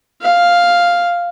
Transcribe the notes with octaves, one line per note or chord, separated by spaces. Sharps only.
F5